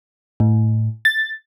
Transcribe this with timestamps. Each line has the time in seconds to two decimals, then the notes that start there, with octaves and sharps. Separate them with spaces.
0.40 A2
1.05 A6